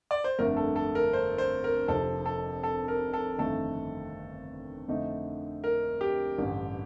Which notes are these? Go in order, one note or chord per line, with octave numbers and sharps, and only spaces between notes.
D5
C5
G1 F2 D3 A3 A#4
A4
A4
A#4
C5
C5
A#4
F1 F2 C3 F3 A4
A4
A4
A#4
A4
G1 F2 D#3 A3 A4
F2 D3 A3 D#4
A#4
G4
A1 G2 D3